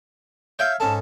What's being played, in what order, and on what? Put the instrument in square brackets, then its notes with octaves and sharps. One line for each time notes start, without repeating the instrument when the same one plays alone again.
[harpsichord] C#5 E5 F5 [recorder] G6
[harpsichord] G#2 C#4 A4 [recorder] A5